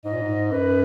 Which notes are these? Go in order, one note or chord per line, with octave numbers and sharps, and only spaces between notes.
G#2 D#5
A#2
G#2
F#2 B4